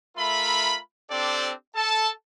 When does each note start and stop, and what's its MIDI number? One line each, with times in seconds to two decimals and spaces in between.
0.17 0.78 57
0.17 0.78 65
0.17 0.78 70
0.17 0.78 76
0.17 0.78 83
1.11 1.52 60
1.11 1.52 62
1.11 1.52 67
1.11 1.52 69
1.11 1.52 72
1.11 1.52 74
1.76 2.10 69
1.76 2.10 81